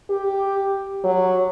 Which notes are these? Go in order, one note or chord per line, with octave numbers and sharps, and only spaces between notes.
G4
F#3